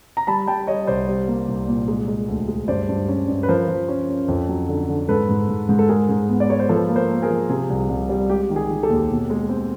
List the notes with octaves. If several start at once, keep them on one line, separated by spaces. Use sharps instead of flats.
A#5
G3 A5 B5
G3 G5 A5
G3 C#5 D#5
C2 C5 D5
G3
A#3
C2
A#2
G#3
G#3
D2
G#3
G2 C5 D5
G2
C#4
G2
B4
F3 A#4 C5
F3
C#4
C#4
F2
F#3
D3
D3
G#2 A4 B4
G#2
G#2
G#2
A4
G#3 G#4 A#4
G#2
B3
D5
G#3 C#5
C5
F3 A4 B4
A#3
A#4 C5
A#3
G#4 A#4
F3
C3 G#4
C2
C2
G3
G#3 G4
D#3
G#4
D#3
G4 A4
D#2
B2
G#3
C4